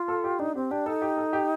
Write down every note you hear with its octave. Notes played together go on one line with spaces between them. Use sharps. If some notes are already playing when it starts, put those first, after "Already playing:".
Already playing: F4
A4
G4
D4 D#4
C4 G4
D4 G4
D#4 A4
G4
A4
G4